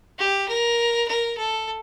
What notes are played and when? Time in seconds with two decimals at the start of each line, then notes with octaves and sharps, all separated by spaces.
0.19 G4
0.48 A#4
1.08 A#4
1.37 A4